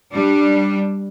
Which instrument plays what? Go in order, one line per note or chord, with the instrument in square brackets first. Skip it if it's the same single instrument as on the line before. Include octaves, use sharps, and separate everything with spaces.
[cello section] G3 D4